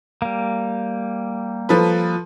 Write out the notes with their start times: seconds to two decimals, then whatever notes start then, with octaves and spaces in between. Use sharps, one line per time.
0.22 G3 A#3
1.69 F3 A4 B4